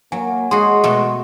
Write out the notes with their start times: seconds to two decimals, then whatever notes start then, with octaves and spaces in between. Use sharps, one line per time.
0.12 F#3 A#3 G#5
0.51 G#3 F#4 G#4 C6
0.84 B2 A3